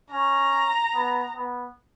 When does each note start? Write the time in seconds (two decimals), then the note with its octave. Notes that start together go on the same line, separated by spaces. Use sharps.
0.10 C#4 A#5
0.94 B3
1.35 B3